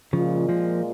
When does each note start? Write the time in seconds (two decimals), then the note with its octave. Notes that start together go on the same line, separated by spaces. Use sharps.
0.13 A#2 C#3 F3 G#3 F4
0.49 F3 A#3